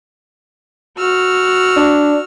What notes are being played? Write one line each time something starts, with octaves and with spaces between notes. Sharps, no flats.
F#4 E6 F6
D4